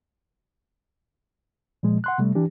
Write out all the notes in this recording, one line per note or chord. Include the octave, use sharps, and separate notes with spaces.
A#2 F3 G#3
F#5 C6 F#6
C3 G3 A3
E3 D4 G4